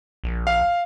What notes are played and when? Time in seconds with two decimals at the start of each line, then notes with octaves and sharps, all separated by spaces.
0.24 A#1
0.47 F5